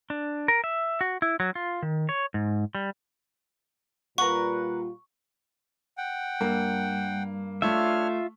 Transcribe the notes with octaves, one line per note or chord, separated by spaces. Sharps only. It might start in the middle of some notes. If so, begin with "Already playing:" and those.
D4
A#4
E5
F#4
E4
F#3
F4
D#3
C#5
G#2
G3
A#2 G3 F4 A#4 B4 F#5 C#6
F#5 G5
G2 A#3
A3 D4 F4 C#5 E5 F6